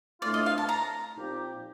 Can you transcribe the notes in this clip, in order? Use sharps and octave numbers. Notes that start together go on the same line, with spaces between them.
A2 A3 D4 F4 D5
D#5
F5
A5
A#5
A#2 F3 C4 D#4 G4